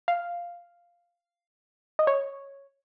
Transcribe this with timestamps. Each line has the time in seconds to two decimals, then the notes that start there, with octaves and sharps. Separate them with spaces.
0.08 F5
1.99 D#5
2.07 C#5